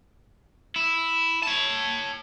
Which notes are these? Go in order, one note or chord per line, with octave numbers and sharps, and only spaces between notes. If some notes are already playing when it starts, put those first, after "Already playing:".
E4
C#5 A5